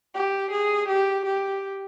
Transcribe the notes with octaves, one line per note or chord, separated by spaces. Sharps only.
G4
G#4
G4
G4